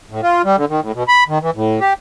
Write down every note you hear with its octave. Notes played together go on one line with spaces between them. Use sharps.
A2
F4
G3
D3
D#3
A2
B2
B5
D#3
E3
A2
G4